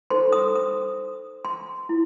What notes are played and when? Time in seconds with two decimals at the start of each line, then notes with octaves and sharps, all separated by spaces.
0.10 D#4 A4 C5 C6
0.32 D#6
0.55 D#6
1.45 C6
1.89 E4